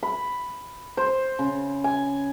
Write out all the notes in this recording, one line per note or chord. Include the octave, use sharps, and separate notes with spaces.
B5
C5
C#3
G#5